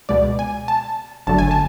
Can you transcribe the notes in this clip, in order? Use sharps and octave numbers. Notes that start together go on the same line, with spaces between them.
C#2 B2 G#3 D5
G#5
A5
G1 F#2 D3 F#3 A3 A5
G#5
A5